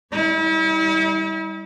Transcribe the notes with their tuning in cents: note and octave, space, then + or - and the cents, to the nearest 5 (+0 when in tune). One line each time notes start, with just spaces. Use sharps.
G3 +0 E4 -40